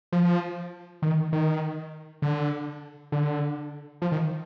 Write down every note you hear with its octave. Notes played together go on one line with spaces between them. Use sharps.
F3
D#3
D#3
D3
D3
F3
D#3